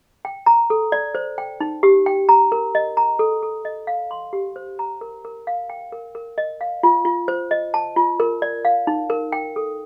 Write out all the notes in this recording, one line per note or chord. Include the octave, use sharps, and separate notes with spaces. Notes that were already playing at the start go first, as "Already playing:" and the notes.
G5
A#5
A4
D5
C5
G5
D#4
G4
G5
A#5
A#4
D#5
A#5
A4
A4
D#5
F5
C6
G4
C5
A#5
A#4
A#4
F5
G5
A#4
A#4
D#5
F5
F4
F4
C5
D#5
A5
F4
A#4
D5
F5
D#4
A#4
G5
A4